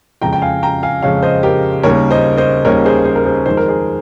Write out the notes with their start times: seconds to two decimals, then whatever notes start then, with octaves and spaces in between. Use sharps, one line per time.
0.21 F2 C#3 G#3 G5 A#5
0.33 G5
0.42 F5 G#5
0.63 G5 A#5
0.83 F5 G#5
1.02 F2 C#3 G#3 C#5 F5
1.23 C5 D#5
1.43 G4 A#4
1.83 D#2 C#3 G3 A#3 A#4 C#5
2.11 C5 D#5
2.38 C5 D#5
2.65 D#2 C#3 G3 A#3 A#4 C#5
2.85 G#4 C5
3.05 G#4 C5
3.16 A#4
3.25 G#4 C5
3.46 F2 D#3 G#3 C5
3.57 A#4
3.68 G#4 C5